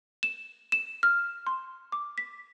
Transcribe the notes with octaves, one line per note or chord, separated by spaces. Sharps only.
E7
E7
F6
C6
D6
B6